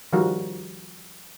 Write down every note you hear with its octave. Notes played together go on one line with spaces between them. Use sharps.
D#3 F3 G3 F4 F#4 A#4